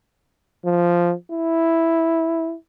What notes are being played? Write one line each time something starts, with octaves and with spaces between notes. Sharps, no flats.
F3
E4